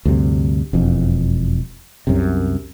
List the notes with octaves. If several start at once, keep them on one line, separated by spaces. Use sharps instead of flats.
D2 G2 C3
E1 F2
C2 F#2 C3